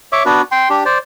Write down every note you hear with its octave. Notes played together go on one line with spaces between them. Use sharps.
C#5 E5 D6
B3 D4 F#4 B4
G5 C6
D4 G4
C5 D5